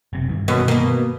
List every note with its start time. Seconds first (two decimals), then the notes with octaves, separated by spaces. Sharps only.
0.13 F#1 C3
0.29 G2 D#3 E3
0.48 F#2 B2
0.68 B2 A#3